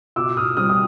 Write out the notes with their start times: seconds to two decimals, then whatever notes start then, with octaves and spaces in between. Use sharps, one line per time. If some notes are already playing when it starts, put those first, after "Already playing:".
0.16 B2 D6 E6
0.37 D#6 F6
0.57 G3 C4 D#6 F6
0.69 D#6